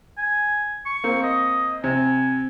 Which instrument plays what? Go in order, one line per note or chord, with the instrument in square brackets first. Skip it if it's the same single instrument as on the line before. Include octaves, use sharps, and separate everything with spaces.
[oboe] G#5
C#6
[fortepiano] A#3 C4
[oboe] D#5
[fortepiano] C3 [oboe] G#5